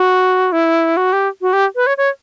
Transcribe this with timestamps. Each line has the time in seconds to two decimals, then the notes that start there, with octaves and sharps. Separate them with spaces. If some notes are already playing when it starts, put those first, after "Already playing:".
Already playing: F#4
0.52 E4
0.97 F#4
1.13 G4
1.41 F#4
1.53 G4
1.76 B4
1.87 C#5
1.97 C#5